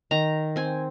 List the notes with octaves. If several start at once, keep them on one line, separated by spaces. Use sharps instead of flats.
D#3 A#5
C4 G#5